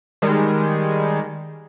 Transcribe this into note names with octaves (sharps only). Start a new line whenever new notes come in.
D#3 G3 G#3